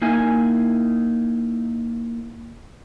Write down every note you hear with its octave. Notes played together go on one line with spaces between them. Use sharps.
A#3 D#4 E4 G#5